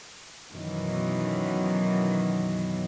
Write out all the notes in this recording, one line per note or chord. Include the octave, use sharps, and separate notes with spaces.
F#2 B2 D#3 E3 F#3